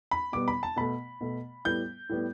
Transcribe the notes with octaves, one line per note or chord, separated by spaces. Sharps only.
B5
B2 G3 B3 D6
B5
A5
B2 A3 B5
B2 A3
A2 G3 B3 G6
A2 G3 B3